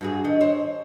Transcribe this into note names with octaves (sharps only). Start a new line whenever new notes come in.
G2 F#4 G#4
D#3 D#5
C5 C#5